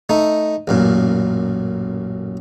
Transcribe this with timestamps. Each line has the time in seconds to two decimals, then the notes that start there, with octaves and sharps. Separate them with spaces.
0.09 A3 D#4
0.68 A1 F#2 A#2